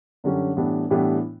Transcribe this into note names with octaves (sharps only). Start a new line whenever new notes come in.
F#2 D3 G3 C#4
A2 E3 G3 B3 D4
A2 E3 G3 B3 D4